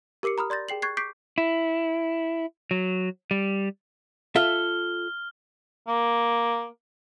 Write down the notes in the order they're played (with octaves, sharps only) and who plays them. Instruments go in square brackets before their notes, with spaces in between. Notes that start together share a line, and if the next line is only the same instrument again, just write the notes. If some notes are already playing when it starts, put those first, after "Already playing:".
[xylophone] G4 A#4 D6 C7 C#7
A#5 B5 D#6 F6
D5 C6 G6 A6 A#6
G#4 G5 C7 F#7
C#6 F#6 G#6 A6 C7
C#6 D6 G6 B6 C7 D7
[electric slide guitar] E4
F#3
G3
[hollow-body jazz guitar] F4 A4 E5 [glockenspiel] F6 G7
[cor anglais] A#3